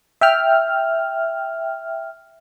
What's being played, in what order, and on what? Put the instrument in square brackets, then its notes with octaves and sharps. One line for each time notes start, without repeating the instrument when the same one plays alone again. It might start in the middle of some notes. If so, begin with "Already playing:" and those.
[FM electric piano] E5 G5 F6